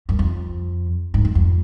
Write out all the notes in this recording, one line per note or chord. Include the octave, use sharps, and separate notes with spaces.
F#2
F2
G#2
F2
F2